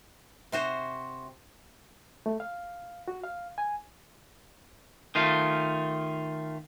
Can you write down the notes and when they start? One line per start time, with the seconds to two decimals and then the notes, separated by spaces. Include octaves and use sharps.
0.52 C3 F#4 C5
2.26 A3
2.40 F5
3.08 F#4
3.24 F5
3.58 G#5
5.15 D#3 A3 F4